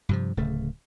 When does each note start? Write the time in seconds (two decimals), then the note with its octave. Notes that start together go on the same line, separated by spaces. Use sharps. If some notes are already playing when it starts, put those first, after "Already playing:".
0.09 G2 C3 F3
0.37 D1 C#3 A3